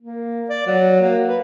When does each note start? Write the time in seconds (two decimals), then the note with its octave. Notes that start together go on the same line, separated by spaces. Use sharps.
0.01 A#3
0.49 D5
0.67 F#3
1.02 A#3
1.28 B4